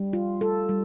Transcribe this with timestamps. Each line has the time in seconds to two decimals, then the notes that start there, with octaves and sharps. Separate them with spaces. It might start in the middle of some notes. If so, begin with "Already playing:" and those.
Already playing: G3
0.13 F4
0.41 A4
0.69 G3